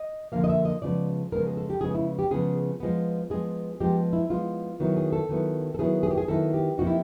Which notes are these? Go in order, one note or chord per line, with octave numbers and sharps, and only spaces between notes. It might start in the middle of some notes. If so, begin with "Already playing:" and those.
Already playing: D#5
D3 F3 A#3 F5
D#5
E5
D#5
C#3 F3 G#3 B3 D5
C#3 F3 G#3 B3 A#4
G#4
A4
G4
C#3 F3 G#3 B3 G#4
E4
G4
C#3 F3 G#3 B3 G#4
F3 G#3 B3
F3 G#3 B3 G#4
F3 G#3 B3 G4
E4
F3 G#3 B3 F4
D#3 F#3 B3 E4
G#4
A4
D#3 F#3 B3 E4
A4
D#3 F#3 B3 E4 G#4
G#4
G4
G#4
D#3 F#3 B3 E4 A4
G4
C3 F3 A#3 D#4 F#4
E4